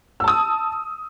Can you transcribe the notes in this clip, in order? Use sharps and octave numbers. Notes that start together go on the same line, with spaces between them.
A5 D#6 E6